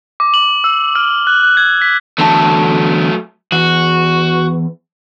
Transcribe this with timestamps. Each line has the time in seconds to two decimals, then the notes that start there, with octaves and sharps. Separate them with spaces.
0.20 D6
0.34 F#7
0.64 E6
0.95 F6
1.27 F#6
1.43 F#6
1.57 G#6
1.82 B6
2.18 E2 D3 F#3 A3 A5
3.52 E2 F#4